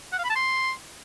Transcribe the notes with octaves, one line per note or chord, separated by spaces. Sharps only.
F#5
F5
B5
A5
C6